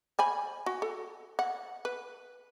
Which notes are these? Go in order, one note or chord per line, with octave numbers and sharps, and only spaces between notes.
C5 G#5 B5
F#4
A4
F#5
B4